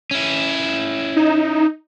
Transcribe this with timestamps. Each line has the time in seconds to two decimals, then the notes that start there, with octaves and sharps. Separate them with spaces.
0.11 C#4 E4
1.16 D#4